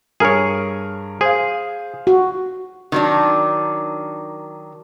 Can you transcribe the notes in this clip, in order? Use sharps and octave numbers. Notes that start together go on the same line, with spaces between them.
G2 G#4 A#4 C#5 F6
G#4 C5 F5
F#4
D#3 F#3 D4